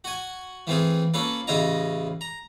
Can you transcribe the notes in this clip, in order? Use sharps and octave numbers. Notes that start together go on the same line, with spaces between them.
F#4 G#5
E3 A3 C4 F4 G#4
A#3 C#4 F4 A4 B4
A1 C#3 E4 F4 D#5 A#5
A#5